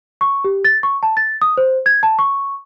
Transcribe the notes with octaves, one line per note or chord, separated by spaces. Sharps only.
C#6
G4
A6
C#6
A5
A6
D#6
C5
G#6
A5
C#6